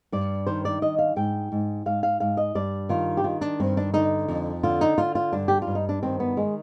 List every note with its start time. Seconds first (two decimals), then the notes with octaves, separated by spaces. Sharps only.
0.12 G2 D5
0.47 D#3 C5
0.65 D5
0.82 D#3 D#5
0.99 F5
1.16 G#2 G5
1.52 G#2
1.86 G#2 F5
2.03 F5
2.20 G#2 F5
2.37 D#5
2.55 G2 D5
2.89 D#3 F4
3.17 G4
3.24 D#3 F4
3.41 D4
3.60 G2 C4
3.77 D4
3.94 D3 D#4
4.28 F2
4.63 D3 F4
4.81 D#4
4.98 D3 F4
5.15 F4
5.32 G2 D4
5.48 G4
5.62 F4
5.67 G2
5.75 D#4
5.89 D4
6.03 D#3 C4
6.20 B3
6.37 D#3 G#3